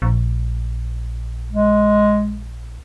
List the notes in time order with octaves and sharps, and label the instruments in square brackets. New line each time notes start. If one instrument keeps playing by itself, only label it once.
[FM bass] A#1
[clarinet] G#3